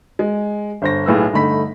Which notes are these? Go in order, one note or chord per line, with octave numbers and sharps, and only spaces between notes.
G#3
G1 C5 A#6
B1 A2 G#4 B4 E6
G1 D3 A3 D#4 B5 B6